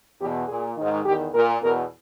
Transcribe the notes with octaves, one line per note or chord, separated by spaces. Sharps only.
E2 B2 G4
A#2 G#4
G#2 D#3
E2 D#3 G4
A#2 A#4
E2 B2 A#4